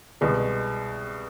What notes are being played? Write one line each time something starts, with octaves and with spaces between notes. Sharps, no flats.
C2 B2 G#3